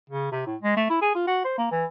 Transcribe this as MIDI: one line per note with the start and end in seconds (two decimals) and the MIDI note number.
0.10 0.30 49
0.32 0.43 48
0.46 0.56 45
0.62 0.75 56
0.77 0.85 57
0.90 1.00 64
1.01 1.13 68
1.15 1.26 65
1.27 1.42 66
1.45 1.56 72
1.58 1.66 58
1.71 1.85 52